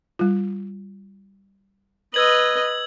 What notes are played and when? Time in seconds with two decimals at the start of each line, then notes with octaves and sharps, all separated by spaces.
0.19 G3 F4
2.14 B4 D#5 E6 G#6 F#7